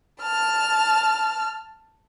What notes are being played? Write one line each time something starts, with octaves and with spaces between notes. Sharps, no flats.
A5 F6